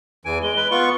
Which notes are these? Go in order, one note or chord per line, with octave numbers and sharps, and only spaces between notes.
E2 E3 G#5 D7
G#3 G7
B4
B3 F4 C#6
C#7